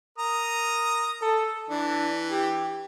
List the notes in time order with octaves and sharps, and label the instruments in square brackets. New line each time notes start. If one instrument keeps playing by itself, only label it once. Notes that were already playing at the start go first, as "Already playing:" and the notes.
[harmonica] A#4 D#6
[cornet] A4
[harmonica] E3 [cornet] D4
[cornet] G4